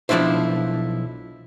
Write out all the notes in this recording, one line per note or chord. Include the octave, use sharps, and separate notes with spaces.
B1 F3 C#4 D4 E4 C5